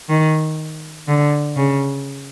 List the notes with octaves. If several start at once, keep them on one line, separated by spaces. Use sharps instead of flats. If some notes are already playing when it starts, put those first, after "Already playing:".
D#3
D3
C#3